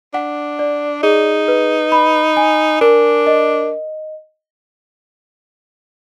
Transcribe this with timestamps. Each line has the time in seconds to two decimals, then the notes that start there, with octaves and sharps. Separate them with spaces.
0.14 D4 F#5
0.59 D5
1.03 D#4 G#4
1.48 B4
1.92 B5
2.37 G#5
2.81 D4 A#4
3.27 D#5